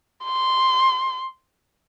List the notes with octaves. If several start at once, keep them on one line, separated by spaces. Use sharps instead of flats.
C6